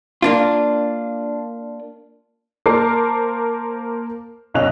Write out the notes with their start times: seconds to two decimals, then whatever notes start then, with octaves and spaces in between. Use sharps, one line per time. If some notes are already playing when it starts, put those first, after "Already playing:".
0.22 A#3 D4 F4
2.66 A#3 A#4 C5 A5 D6 C7
4.54 F#1 B1 C#4 D#5 F#6 F7